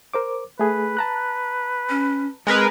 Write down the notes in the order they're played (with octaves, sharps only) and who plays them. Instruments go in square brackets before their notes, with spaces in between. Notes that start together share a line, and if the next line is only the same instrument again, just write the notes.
[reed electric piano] A#4 C5 D6
[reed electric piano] A3 G#4 [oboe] B4
[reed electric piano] A5 A#5 F#6
[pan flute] C#4
[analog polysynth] G#3 A#4 B4 [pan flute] C4